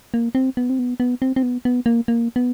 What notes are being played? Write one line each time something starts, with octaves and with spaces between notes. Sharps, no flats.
A#3
C4
B3
C4
B3
B3
C4
C4
B3
B3
A#3
A#3
B3